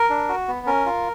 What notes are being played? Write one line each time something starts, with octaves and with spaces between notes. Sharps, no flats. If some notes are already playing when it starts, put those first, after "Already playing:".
Already playing: A#4
D4
F#4
B3
C#4 A#4
F4